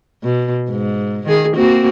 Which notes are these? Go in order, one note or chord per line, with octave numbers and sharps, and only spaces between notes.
B2
G#2
D#3 G#4
A#3 C4 F#4